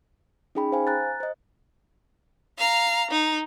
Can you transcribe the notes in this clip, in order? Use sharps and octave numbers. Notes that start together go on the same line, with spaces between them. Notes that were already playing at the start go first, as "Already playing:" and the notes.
C#4 D#4 G#4 G5 B5
C5 F5 G#5
A#5 F#6 A6
C5 D#5
F5 A#5
D#4